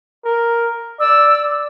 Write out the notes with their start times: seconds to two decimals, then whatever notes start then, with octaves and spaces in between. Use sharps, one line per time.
0.25 A#4
1.00 D5 E6